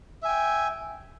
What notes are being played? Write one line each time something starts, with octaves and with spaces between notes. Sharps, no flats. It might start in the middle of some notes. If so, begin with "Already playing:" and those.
E5 G5 G#5